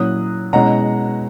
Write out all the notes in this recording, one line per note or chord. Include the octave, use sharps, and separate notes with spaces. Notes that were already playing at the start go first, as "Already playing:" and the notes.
Already playing: A#2 F#3 C#4 E4 D#6 F#6
B2 G#3 C#4 E4 F#5 A#5